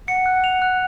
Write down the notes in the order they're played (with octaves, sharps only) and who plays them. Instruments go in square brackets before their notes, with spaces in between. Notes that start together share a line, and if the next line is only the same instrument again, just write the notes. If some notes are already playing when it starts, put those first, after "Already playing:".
[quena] F#5 [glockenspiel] C#7
[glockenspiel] F#6
F7
F#6